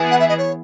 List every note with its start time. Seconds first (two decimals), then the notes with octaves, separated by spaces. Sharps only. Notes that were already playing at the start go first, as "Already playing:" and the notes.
Already playing: E3 B3 E4 G#4
0.11 F#5
0.20 E5
0.29 D#5
0.38 C#5